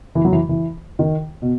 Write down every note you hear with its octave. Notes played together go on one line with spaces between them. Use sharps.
E3
F#3
E3
E3
D#3
B2